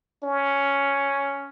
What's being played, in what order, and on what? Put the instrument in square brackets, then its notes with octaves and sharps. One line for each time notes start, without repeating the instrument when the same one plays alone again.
[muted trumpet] C#4